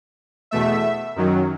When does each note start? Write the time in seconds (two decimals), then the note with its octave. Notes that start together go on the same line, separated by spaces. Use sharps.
0.51 E2 B2 A3 E5
1.16 F#2 D#3 F#3